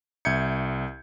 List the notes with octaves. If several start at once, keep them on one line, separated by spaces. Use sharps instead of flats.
C2 E5 G6 G#6 C#7